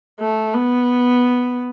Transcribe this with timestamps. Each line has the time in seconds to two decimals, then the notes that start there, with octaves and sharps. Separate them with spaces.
0.20 A3
0.54 B3